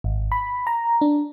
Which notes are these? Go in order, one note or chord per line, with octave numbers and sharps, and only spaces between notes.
G#1
B5
A#5
D4